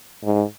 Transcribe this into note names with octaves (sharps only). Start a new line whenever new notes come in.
G#2